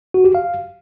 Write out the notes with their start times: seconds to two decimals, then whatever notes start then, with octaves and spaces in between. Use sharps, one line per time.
0.14 F#4
0.24 G4
0.35 F5